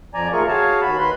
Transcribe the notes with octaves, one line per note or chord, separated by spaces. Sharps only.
F2 F3 D5 G#5 A#5
D#2 A3 F4 G#4 A#4 C#6
F#4 G#4 C#5 F5 G#5 A5
D#2 F#4 B5
D#3 B4 B5 C6